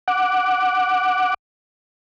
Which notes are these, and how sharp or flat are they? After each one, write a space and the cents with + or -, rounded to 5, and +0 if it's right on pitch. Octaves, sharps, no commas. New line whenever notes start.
F#5 +0 D6 +0